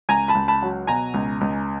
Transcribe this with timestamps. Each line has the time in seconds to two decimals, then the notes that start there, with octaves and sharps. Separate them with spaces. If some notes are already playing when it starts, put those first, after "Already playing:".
0.09 C#2 G#5 A#5
0.28 A5 B5
0.35 C#2
0.48 A5 B5
0.62 F#3
0.87 B2 G#5 A#5
1.14 C#2
1.41 C#2